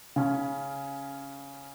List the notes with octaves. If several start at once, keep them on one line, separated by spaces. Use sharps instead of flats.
C#3 C#4